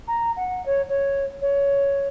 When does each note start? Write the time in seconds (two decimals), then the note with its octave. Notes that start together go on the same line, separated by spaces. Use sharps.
0.08 A#5
0.36 F#5
0.66 C#5
0.89 C#5
1.41 C#5